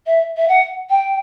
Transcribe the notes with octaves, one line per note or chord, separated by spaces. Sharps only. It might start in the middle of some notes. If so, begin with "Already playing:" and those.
E5
E5
F#5
G5